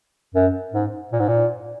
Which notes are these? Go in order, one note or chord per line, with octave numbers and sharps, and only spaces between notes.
F#2
G#2
A#2
G#2
A#2